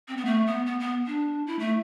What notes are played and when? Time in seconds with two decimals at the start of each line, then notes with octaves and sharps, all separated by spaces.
0.08 C4
0.17 B3
0.25 A3
0.46 B3
0.66 B3
0.80 B3
1.07 D4
1.47 E4
1.59 A3